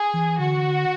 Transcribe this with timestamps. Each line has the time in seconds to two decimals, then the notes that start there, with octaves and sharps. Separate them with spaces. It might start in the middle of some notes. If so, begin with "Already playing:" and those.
Already playing: G#4
0.14 E3
0.39 D3 F#4